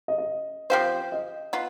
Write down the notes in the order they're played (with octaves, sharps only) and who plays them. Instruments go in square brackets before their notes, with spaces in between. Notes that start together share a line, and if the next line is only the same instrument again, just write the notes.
[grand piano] D#5
D#5
[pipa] F3 C4 G4 C5 [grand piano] F5
[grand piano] D#5
[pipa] B3 F4